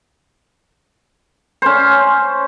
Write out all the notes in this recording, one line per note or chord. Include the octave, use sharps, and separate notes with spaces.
C#4 C5